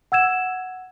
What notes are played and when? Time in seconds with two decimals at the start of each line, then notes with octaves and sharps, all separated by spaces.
0.12 F#5 E6 G#6 E7